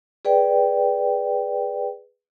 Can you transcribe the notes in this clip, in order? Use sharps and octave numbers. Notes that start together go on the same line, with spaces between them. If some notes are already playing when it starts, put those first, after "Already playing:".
G#4 B4 D5 G5